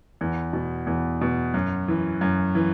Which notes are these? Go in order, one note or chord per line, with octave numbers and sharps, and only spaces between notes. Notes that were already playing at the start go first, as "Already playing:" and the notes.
E2
B2
E2
B2
F#2
E3
F#2
E3